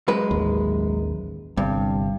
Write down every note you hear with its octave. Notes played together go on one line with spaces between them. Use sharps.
F#2 G#3 B4
A1 D#2
G1 G2 C3